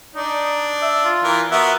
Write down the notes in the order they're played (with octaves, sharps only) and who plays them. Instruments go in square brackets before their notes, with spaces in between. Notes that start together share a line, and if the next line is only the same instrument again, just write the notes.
[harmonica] D4 [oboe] D#4
[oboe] E5
F4
[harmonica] E3 A#4
[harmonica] B3 F#4 A#4 [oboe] E5